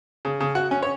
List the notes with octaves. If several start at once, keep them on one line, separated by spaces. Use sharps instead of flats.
C#3
C#3
F#4
C#4
C#5